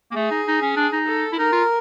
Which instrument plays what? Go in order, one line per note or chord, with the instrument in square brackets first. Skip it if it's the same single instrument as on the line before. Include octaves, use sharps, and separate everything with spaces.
[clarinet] A#3
[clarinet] A3 [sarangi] G#4
[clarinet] D#4
D#4
C#4
D4
D#4
[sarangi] A4
[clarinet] E4
[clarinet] D#4 [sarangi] A#4
[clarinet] F4